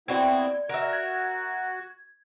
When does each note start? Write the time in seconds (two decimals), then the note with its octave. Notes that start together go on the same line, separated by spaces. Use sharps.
0.08 B3 C4 E4 F#4 D5 G#6
0.69 F#4 A#4 E5
0.93 G#6